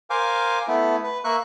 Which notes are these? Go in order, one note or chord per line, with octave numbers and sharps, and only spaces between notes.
A#4 C5 F5 G#5 D6
A3 B3 E4
B4
A#3 A#4 E5 C#6 F#6